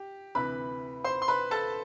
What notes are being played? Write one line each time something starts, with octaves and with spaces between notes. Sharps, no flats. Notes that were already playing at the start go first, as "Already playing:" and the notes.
Already playing: G4
D2 C3 E3 B4 B5
C5 C6
C6
B4 B5
A4 A5